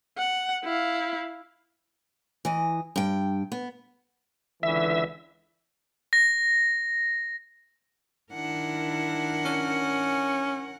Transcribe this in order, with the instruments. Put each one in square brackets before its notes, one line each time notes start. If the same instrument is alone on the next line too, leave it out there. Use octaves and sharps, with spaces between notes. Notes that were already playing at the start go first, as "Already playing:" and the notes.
[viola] F#5
E4 F5
[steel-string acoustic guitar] E3 D#5
G2 G5
B3
[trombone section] C#2 D3 E3 [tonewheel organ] E5
[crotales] A#6
[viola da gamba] D#3 D4 E4 [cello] A#4 F#5
[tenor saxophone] C#4